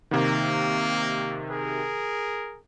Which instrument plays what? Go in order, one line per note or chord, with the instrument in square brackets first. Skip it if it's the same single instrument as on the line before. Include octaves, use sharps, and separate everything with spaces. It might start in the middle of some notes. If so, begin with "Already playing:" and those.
[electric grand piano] C3 D#3 [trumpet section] A#3
[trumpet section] G#4 A#4